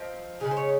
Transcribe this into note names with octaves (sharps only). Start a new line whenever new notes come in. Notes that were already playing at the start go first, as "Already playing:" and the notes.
Already playing: F3 C4 D#4
C#3 G#3 D#4 G#4
C5
C#5